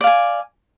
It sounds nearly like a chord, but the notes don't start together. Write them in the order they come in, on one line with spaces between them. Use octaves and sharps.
D5 F5 G#5